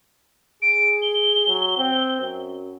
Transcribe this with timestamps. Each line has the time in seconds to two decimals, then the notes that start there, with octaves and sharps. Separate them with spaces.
0.62 G#4 D7
1.02 G7
1.47 F#3
1.77 C4
2.21 F#2